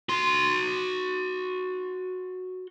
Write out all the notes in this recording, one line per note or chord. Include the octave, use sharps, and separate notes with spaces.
F#4 C6